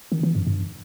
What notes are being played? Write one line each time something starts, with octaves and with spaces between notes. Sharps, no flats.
D#3
E3
G2
G2